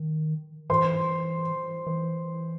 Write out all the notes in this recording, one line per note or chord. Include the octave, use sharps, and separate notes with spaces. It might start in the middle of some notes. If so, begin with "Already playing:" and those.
Already playing: D#3
E3 C5 C6
E3